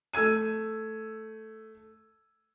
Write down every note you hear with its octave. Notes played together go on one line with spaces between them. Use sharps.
A3 E6 G#6 D#7